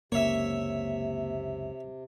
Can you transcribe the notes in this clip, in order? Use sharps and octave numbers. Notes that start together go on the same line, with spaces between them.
F#1 C#2 C3 A#3 C#5 E5